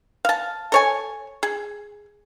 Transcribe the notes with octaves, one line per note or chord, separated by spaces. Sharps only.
F5 A5
A4 C#5 G#5
G#4